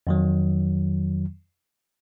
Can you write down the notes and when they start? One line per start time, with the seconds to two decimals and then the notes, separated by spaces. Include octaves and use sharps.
0.07 F2 D#3 F#3